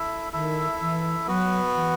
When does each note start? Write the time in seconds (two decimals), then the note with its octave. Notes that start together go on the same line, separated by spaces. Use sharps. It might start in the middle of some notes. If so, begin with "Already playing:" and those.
Already playing: E4 A4 E5
0.33 D#3 E4 A4 E5
0.80 E3
1.27 F#3 B3 F#4 B4
1.74 E3